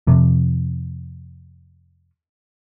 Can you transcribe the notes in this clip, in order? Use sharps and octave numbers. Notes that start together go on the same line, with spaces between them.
F2 C3